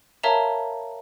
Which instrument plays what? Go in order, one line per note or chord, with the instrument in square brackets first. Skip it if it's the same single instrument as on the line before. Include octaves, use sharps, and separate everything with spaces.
[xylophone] A#4 C#5 E5 F5 A5 A#5